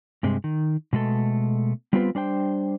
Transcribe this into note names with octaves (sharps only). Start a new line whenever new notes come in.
G2 C3 G#3
D#3
B2 G#3 A3 A4
G3 B3 C4 F4 A#4 B4
G3 D4 C5 G5